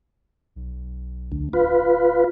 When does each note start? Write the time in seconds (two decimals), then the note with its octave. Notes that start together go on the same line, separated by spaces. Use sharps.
0.56 B1
1.32 D2
1.53 D1 F4 B4